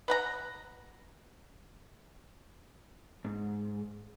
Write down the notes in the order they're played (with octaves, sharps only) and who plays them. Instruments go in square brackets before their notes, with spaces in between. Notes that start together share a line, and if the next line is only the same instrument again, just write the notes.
[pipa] B4 F#5 A#5
[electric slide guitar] G#2